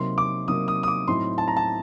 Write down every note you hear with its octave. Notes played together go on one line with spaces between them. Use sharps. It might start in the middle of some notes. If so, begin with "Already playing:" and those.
Already playing: C3 F#3 A#3 D#4 C6
D6
C3 F#3 A#3 D#4 D#6
D#6
D#6
D6
A2 F#3 C4 D#4 C6
A5
A#5
A5